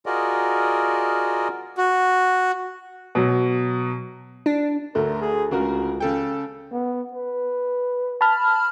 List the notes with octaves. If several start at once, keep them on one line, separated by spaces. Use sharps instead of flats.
F4 F#4 G#4 A#4 D5 D#5
F#4
B2 F#3
D4
D2 A3 A#4
G#4
C#2 C#3 F#4 A#4
C#3 A4 G5
B3
B4
A5 B5 F6